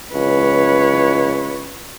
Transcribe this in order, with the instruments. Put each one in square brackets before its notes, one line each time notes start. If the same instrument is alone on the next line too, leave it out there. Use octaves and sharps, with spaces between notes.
[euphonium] C#2 [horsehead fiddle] B4 C#5